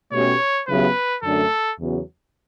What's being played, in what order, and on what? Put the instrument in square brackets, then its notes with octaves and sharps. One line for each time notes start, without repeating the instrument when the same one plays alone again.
[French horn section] B2 A3 C#4 G4 [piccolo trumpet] C#5
[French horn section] C#3 F#3 B3 E4 G4 [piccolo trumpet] B4
[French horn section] F#2 D3 A3 D4 [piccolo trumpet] A4
[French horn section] E2 C#3 F#3 B3 F#4